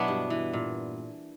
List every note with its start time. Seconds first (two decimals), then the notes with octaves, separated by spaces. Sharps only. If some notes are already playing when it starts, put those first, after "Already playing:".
Already playing: B2 F#3 B3 D4 E4
0.08 G2
0.30 E3
0.53 A#2